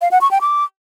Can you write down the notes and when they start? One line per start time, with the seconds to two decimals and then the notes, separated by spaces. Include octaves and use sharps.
0.01 F5
0.11 F#5
0.21 C#6
0.31 G5
0.41 D6